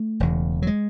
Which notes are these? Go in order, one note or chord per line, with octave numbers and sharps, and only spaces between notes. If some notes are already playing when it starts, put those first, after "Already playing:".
Already playing: A3
E1 E2 C#3
F#3
G#3